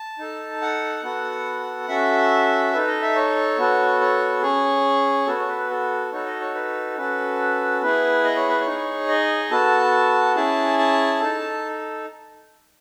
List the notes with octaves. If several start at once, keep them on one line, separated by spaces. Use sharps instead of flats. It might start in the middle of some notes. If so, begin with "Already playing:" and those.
Already playing: A5
D#4 A4
F#5
B3 F#4 A4
C#4 F#4 A4 E5
D#4 A4 B4
D#5
E5
C#5
B3 F#4 A4
C#5
C#4 G#4 C#5
B3 F#4 A4
C#5
B4
A4
D#4 F#4 A4 C#5
D#5
C#5
B4
C#4 F#4 A4 B4
B3 E4 G#4 B4
D#5
C#5
B4
C#5
D#4 G#4
D#5
B3 F#4 A4 A5
C#4 E4 G#4 A5
A5
D#4 A4